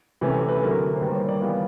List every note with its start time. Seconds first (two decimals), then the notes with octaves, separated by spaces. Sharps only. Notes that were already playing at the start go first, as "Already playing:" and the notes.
0.21 C3 E3 A3 C#4 B4
0.48 B4
0.61 D3 F#3 A3 A#4
0.95 C5
1.01 D#3 G3 A#3 B4
1.15 C#5
1.29 D5
1.42 E3 G3 B3 F5